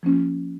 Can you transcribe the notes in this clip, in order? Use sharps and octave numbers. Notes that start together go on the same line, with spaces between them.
F3 A#3 C#4 F4